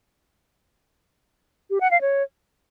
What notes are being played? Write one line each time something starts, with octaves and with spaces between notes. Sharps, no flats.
G4
F#5
F5
C#5